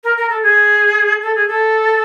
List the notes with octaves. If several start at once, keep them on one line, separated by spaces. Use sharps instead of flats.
A#4
A#4
A4
G#4
A4
G#4
A4